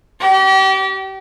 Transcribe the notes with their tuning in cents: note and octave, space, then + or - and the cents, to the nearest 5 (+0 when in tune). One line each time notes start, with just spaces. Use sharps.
G4 -35